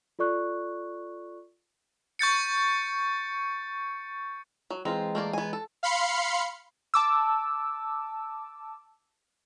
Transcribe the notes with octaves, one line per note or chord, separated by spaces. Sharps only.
F4 A4 D5 C#6 F#6
C#6 G6 A6 C#7
F#3
E3 G#3 C4 F4 A#5
A3 A#3 D5
B3 G#5
A4
F5 B5 C6 C#7
A5 D6 E6